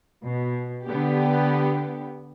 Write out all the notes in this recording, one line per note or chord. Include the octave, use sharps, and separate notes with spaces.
B2
D3 B3 G4